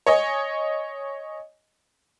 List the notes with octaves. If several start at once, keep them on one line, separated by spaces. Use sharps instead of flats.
C#5 D#5 G#5